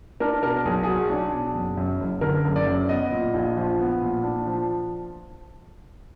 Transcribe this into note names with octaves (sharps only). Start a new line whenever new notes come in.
D4 A#4
B2 A#4
B1 G#4
F#3 G#4
D4
B2
F#1
F#2
F#1
D3 A#4
F#1
D5
F#2
B3 D#5
A#2
A#1
F3
B3
A#2
D4
F3